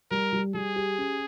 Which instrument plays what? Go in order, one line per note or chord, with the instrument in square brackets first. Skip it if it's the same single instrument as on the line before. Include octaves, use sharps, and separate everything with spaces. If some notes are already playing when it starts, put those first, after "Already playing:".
[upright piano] G3 [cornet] A#4
[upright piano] G3
[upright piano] G3 [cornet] G#4
[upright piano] G4
C#4